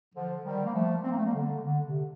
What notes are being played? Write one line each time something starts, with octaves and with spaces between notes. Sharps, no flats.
D3 F3
D#3 G3
A#3
F3 A3
C4
A#3
A3
G3 A#3
D3
D3
C3